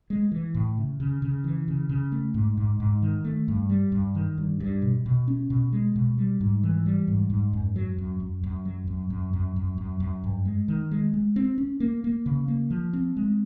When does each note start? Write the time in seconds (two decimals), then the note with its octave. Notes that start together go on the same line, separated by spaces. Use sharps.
0.10 G#3
0.32 E3
0.55 A2
0.77 C#3
1.00 C#3
1.22 C#3
1.44 E3
1.68 C#3
1.89 C#3
2.12 A3
2.34 G#2
2.57 G#2
2.80 G#2
3.02 D#3
3.24 A3
3.48 G2
3.69 G3
3.92 G2
4.15 D#3
4.38 G2
4.60 G2
4.82 B2
5.06 B2
5.28 C#4
5.50 B2
5.73 G#3
5.96 B2
6.18 G3
6.41 G#2
6.63 E3
6.86 G3
7.08 G#2
7.30 G#2
7.53 F#2
7.76 F#3
7.98 F#2
8.20 F#2
8.43 F#2
8.65 F#3
8.87 F#2
9.10 F#2
9.33 F#2
9.56 F#2
9.78 F#2
10.00 F#2
10.24 G2
10.45 G#3
10.68 D#3
10.91 G#3
11.14 G#3
11.36 C4
11.58 C#4
11.80 A#3
12.04 A#3
12.26 C#3
12.48 A#3
12.70 F3
12.93 C4
13.17 G#3